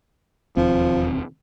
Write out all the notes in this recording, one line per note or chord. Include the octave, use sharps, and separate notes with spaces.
E1 D#2 F3 C4